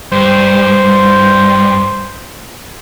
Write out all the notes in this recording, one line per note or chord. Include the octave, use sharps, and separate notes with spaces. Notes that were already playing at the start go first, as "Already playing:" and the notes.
G2 C5